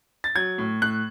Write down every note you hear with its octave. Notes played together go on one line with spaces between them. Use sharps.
A6
F#3 G#6
A2
A2 F#6